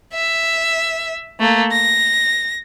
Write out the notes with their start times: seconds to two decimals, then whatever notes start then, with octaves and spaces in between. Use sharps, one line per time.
0.14 E5
1.40 A3 A#3
1.72 A#6